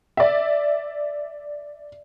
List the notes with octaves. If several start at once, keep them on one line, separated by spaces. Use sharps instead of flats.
D5 E5